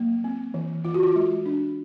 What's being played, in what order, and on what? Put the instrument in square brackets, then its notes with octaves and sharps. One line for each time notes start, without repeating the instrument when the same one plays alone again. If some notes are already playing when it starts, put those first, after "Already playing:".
Already playing: [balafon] F#3 A#3
C4
E3
E3 F4
F#4
F4
G#3
D4